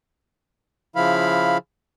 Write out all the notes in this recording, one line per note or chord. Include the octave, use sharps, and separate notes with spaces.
C#3 F3 E4 F5 B5